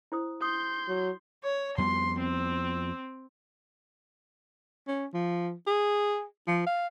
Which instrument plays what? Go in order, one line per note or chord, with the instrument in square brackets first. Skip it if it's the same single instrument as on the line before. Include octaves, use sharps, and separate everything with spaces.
[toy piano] E4 C5 D#6
[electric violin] C6 G6 [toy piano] D#6
[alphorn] F#3
[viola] C#5
[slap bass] F2 G3 B3 [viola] C6
[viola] C4
[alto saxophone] C#4
F3
G#4
F3
F5